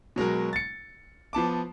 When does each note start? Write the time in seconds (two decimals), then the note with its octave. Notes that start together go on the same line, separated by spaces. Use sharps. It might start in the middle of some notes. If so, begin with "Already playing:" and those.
0.16 B2 F#3 G#3 A#4
0.53 A6 C#7
1.33 F3 B3 A5 D6